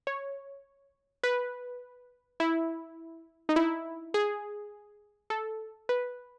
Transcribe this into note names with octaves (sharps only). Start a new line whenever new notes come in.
C#5
B4
E4
D#4
E4
G#4
A4
B4